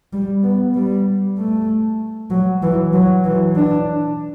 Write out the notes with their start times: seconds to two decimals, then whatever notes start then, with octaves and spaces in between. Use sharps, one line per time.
0.13 G3
0.44 B3
0.75 G3
1.38 A3
2.31 F#3
2.63 E3
2.93 F#3
3.24 E3
3.56 D4